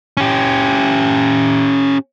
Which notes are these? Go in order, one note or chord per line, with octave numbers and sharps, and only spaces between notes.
C#4 G4